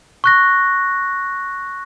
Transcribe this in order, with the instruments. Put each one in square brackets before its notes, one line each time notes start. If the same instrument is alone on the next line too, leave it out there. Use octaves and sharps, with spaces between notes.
[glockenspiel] C#6 F#6 A#6